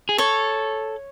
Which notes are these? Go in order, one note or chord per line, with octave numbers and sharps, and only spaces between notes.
G#4
A4 C#5